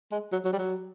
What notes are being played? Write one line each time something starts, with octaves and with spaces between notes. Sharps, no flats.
G#3
F#3
F#3
G3
F#3